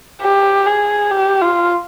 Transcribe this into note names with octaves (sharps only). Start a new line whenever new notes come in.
G4
G#4
G4
F4